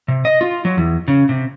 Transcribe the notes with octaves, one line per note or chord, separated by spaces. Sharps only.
C3
D#5
F4
F#3
E2
C#3
C3